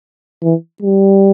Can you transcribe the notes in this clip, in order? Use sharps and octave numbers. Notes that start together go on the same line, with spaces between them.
E3
G3